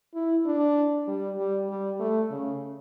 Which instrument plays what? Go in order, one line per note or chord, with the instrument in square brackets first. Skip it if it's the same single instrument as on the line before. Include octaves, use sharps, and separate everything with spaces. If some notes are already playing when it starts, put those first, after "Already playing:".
[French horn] E4
D4
G3
G3
G3
A3
C#3